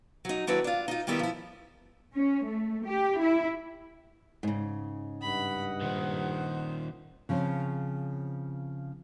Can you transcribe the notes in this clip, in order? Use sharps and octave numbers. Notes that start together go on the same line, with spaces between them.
F#3 D#4
D#2 F#3 D4 E4 B4 D5
D4 F4
D#4 F4
D#3 G3 B3 E4 G4 A#4
F3 E4
C#4
A3
G4
E4
G#2 C#3
G2 D#5 F#5 B5
A#2 D#3 C5
C#3 F3 C4